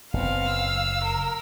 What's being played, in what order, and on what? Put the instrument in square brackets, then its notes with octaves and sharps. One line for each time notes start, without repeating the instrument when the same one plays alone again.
[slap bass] F#1 [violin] B3 C4 [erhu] F5
[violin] E6
[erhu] A#4